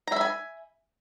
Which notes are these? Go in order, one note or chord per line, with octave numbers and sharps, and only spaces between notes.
E5 G#5 A#5 B5